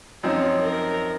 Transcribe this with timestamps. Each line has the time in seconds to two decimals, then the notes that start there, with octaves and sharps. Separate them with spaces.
0.23 F#2 F3 C4 D#4 C#5
0.62 A#4